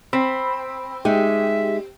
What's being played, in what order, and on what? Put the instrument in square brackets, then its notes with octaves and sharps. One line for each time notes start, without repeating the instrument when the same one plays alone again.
[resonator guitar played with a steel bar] C4 [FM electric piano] B5 E6
[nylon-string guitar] G#3 D#4 [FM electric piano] G4 [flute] E5